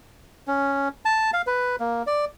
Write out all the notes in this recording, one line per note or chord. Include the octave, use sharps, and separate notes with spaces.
C#4
A5
F5
B4
A#3
D5